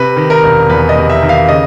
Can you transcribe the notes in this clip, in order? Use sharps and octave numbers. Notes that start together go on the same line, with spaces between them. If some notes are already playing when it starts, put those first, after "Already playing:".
Already playing: C3 B4
D#3
A#4
E1
E2 B4
D#5
C3
E5
D#3
F5
C#3 D#5